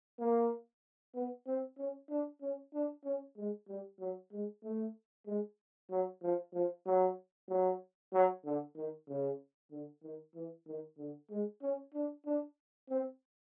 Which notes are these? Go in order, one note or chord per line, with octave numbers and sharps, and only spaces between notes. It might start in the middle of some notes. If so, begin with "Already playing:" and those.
A#3
B3
C4
C#4
D4
C#4
D4
C#4
G#3
G3
F#3
G#3
A3
G#3
F#3
F3
F3
F#3
F#3
F#3
D3
D#3
C#3
D3
D#3
E3
D#3
D3
G#3
C#4
D4
D4
C4